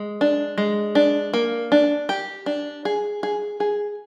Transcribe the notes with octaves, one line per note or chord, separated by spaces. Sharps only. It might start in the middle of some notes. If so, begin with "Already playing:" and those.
Already playing: G#3
D4
G#3
D4
A#3
D4
G4
D4
G#4
G#4
G#4